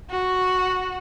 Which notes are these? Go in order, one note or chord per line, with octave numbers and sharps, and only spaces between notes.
F#4